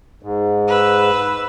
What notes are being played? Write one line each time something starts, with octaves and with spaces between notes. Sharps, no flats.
G#2
B4 E6